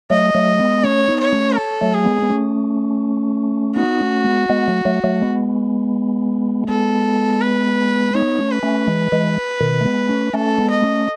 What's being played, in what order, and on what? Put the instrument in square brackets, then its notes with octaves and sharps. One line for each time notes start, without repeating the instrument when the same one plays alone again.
[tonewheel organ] F#3 A3 [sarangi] D#5
[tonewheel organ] F#3 A3
G#3 B3
[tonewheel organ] A3 C#4 [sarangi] C#5
[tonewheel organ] B3 D#4
[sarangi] C#5
[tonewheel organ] A3 C#4
[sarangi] A4
[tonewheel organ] F#3 A3
[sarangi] G#4
[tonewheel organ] G#3 B3
B3
A3 C#4
[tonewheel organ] B3 D#4 [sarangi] F#4
[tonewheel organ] A3 C#4
G#3 B3
G#3 B3
F#3 A3
F#3 A3
F#3 A3
G#3 B3
A3
[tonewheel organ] G#3 B3 [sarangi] A4
[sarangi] B4
[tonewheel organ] B3 D#4 [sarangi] C#5
[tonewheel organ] A3 C#4
[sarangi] B4
[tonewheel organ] A3 C#4
E3 G#3
E3 G#3
B2 D#3
A3
G#3 B3
A3 C#4
[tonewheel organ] A3 C#4 [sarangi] A4
[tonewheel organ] G#3 B3
[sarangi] D#5
[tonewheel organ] A3 C#4